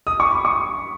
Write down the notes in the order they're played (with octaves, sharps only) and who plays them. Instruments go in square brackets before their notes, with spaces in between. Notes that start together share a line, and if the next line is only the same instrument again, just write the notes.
[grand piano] D#6
C#6
B5
C#6